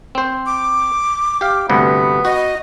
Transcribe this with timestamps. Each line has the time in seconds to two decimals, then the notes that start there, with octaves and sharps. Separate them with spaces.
0.15 C4 C5
0.46 D6
1.41 G4 F5
1.70 D2 G2 C3 B3
2.25 F#4 D#5